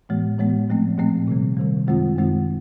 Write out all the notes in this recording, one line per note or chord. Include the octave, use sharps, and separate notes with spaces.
A2 E3 G#3 B3
A2 E3 G#3 B3
A#2 F3 A3 C4
A#2 F3 A3 C4
C3 D#3 G3
C3 D#3 G3
F#2 D#3 G#3 C4 F4
F#2 D#3 G#3 C4 F4